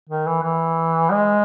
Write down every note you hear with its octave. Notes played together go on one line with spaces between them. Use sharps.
D#3
E3
E3
G#3